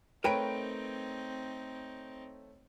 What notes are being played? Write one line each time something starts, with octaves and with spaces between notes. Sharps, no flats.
A3 C4 D#4 A#4 B4 C#5 G5 D7